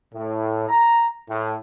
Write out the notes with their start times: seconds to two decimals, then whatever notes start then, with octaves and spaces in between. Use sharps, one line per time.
0.14 A2
0.69 A#5
1.30 A2